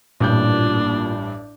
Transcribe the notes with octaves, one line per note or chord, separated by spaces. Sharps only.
A1 G2 A#2 D4 G6